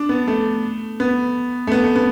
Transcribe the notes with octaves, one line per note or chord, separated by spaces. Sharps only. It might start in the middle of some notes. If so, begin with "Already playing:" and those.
Already playing: D4
B3
A3
B3
A3
B3
A3
B3